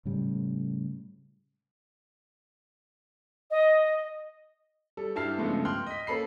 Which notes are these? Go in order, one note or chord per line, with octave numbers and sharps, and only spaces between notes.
A2 C#3 G3
D#5
G3 A4
G2 E4 G4 A5 F6 C7
G2 C#3 F3 G#3 A3 B3
G5 C6 F6 F#6
D#5 B6
A#3 C#4 A4 B5 C7